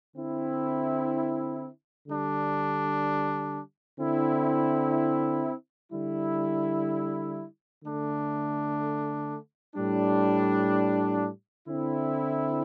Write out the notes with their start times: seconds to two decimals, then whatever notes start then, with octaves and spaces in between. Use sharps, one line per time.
0.16 D3 C4 E4
2.08 D3 G3 D4
3.99 D3 C4 E4
5.92 D3 G3 E4
7.84 D3 A3 D4
9.76 A2 G3 D4
11.68 D3 C4 E4